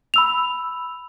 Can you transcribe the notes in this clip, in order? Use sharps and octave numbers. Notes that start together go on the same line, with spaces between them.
B5 E6 F7